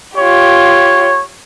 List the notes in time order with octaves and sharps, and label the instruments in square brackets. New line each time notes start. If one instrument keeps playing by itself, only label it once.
[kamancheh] F4 G4 [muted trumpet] C#5